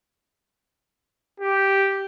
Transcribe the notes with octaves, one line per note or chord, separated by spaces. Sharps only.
G4